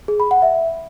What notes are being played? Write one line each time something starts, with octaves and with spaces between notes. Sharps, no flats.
G#4
B5
F#5
E5